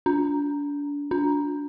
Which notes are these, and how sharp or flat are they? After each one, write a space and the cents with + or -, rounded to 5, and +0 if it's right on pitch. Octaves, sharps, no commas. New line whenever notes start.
D4 -30
D4 -20